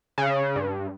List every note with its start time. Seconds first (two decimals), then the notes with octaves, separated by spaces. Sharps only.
0.18 C#3
0.56 G2